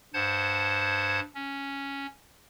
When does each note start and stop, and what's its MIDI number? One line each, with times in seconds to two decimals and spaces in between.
0.14 1.20 43
0.14 1.20 72
0.14 1.20 78
0.14 1.20 81
0.14 1.20 92
1.35 2.07 61